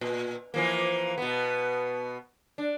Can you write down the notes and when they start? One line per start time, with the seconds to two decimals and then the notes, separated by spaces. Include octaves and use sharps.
0.01 A#2
0.54 E3 F3 A#3
1.18 B2 B3
2.58 D4